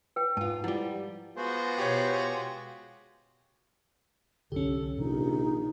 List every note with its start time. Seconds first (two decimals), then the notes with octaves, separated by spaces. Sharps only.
0.16 B4 G5
0.37 G#2 F4 A5
0.64 F3 G3 E4 F#5
1.37 G#3 B3 F4 F#4 C5
1.78 B2 G4 C#5
4.52 C2 F#2 D3 C#4 G4 A4
4.98 A#1 C3 D#3 F3 D#4